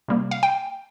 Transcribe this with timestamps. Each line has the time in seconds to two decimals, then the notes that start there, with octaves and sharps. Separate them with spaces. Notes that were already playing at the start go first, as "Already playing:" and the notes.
0.08 C3 G3 A#3
0.31 F5
0.43 G5